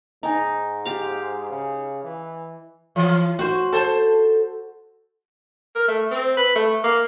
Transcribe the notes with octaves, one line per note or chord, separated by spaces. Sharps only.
G#2 D#4 D#5 G#5
G4 F5
C#3
E3
E3
F#4 C5
A4 C5 A5
A#4
A3
C4
B4
A3
A#3